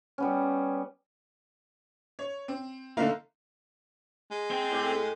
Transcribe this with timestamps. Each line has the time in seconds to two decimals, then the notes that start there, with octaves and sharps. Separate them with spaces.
0.18 G3 B3 C#4
2.19 C#5
2.48 C4
2.97 D3 A3 A#3 D#4 E4 F5
4.31 G#3
4.51 C4 G5
4.71 A2 G4 E5